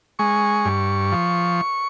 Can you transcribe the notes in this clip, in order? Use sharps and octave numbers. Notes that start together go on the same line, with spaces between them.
G#3 C#6
G2
F3